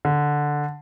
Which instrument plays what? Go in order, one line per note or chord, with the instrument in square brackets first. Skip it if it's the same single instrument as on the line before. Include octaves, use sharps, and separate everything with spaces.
[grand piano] D3